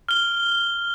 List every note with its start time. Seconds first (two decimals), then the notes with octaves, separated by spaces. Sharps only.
0.09 F6 G7